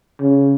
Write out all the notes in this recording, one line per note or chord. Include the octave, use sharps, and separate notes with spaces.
C#3